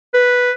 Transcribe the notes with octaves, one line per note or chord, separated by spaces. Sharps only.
B4